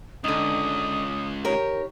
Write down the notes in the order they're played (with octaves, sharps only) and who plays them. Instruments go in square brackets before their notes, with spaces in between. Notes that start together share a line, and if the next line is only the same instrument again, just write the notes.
[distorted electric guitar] C#2 [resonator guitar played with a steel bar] D3 D#4 [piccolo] D#6
[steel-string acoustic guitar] D#3 G4 C#5 [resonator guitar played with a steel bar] A#4